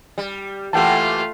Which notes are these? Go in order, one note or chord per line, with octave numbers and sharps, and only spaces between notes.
G3
E3 A3 A#3 F4 G4 F#5 G5 A5